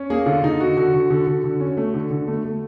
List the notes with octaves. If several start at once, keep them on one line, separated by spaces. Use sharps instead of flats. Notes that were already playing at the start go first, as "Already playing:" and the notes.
Already playing: C#4
A#3 G#4
D3 F4
D3 D#4
D3 F#4
D3 F#4
D3
D3
D3
D3
C#4
A3
D3
D3
A3
A3